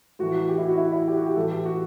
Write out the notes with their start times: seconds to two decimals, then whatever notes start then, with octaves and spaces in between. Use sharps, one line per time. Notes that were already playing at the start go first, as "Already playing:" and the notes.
0.19 A2 E3 F#4
0.34 F#4
0.49 G4
0.58 E4
0.68 F#4
0.78 E4
0.92 E4
1.07 G4
1.17 F#4
1.26 G4
1.36 A2 E3 A4
1.51 G4
1.65 F#4